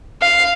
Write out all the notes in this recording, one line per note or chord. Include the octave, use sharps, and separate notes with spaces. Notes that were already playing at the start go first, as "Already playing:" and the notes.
F5